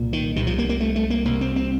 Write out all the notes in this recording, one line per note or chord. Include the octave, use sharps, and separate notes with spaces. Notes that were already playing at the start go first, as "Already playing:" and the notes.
Already playing: C2 A#2
D#3
C2 C3 D#3
F3
A#3
A#3
A3
A3
A#3
C2 C3 A#3
C4
C4